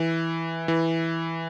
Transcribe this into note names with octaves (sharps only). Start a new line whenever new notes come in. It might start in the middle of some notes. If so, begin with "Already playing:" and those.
Already playing: E3
E3